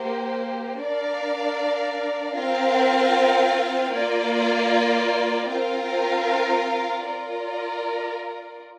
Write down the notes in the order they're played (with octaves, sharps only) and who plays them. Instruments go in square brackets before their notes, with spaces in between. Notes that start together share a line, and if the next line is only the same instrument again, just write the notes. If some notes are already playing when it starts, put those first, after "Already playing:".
Already playing: [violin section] A#3 G4 C5
D4 A#4 D5 F5
C4 F4 A#4 F5
A#3 F4 D5
C4 F4 A#4 F5
F4 A#4 D5